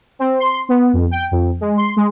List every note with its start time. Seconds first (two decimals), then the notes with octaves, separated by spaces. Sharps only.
0.19 C4
0.40 C6
0.69 B3
0.93 F2
1.11 G5
1.31 F2
1.61 G#3
1.77 C6
1.96 G#3